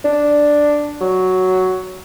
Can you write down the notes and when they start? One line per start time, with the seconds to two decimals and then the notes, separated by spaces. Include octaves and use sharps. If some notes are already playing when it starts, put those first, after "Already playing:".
0.05 D4
1.01 F#3